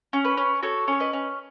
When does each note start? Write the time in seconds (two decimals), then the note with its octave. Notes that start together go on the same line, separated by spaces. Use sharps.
0.13 C#4
0.25 B4
0.37 C#4
0.63 F#4 A4 C#5
0.88 C#4 C#5
1.00 B4 D#5
1.13 C#4